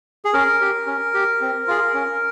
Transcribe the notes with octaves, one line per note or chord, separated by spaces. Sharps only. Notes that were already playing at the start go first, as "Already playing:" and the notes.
G#4
C#4 A#4
G4
C#4
G4
C4
F4 G#4
C#4